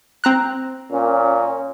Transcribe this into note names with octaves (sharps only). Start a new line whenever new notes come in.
C4 A#5 F#6
A#2 C#4